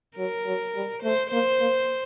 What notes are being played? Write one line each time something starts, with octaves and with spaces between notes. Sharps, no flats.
F#3 A#4
F#3
G3
A3 C5
A#3 C5
A#3